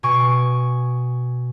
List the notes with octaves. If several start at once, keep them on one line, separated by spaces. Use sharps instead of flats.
B2 G#5 C#6 D7